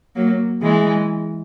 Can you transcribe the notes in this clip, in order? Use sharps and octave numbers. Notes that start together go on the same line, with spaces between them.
F#3 A#3
E3 G#3